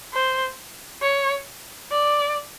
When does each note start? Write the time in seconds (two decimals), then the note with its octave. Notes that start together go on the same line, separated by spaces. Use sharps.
0.13 C5
1.02 C#5
1.91 D5